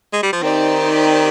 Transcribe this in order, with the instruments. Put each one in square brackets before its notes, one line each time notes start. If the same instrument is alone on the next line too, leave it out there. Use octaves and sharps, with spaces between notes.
[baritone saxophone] G#3
G3
F3
[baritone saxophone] D#3 [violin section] C4 D#4 G4 D5